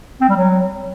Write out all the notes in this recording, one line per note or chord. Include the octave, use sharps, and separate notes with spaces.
C4
G3
F#3